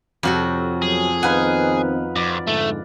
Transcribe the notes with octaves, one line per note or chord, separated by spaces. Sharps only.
F2 C3 F#4 A4 C#5
B2 F#3 G#4
D#3 B3 C4 D#4 B4 F5 F#5 G#5
F2 D5
G#2 D3 A3